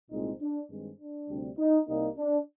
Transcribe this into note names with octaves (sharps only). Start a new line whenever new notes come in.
C2 A#2 G#3 C4 D#4
D4
G2 D#3 G#3 C4
D4
D2 C3 G3 C4
D#4
C2 C3 G3 A#3 D#4
D4